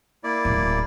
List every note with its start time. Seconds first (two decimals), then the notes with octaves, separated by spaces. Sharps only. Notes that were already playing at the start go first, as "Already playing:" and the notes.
0.24 A#3 E4 D5
0.45 D1